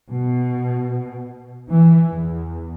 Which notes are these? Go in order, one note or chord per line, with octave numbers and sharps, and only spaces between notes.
B2
E3
E2